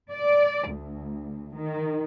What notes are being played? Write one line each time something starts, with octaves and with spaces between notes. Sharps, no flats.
D5
D2
D#3